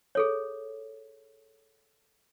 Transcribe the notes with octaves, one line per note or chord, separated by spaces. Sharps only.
G#4 A4 C#5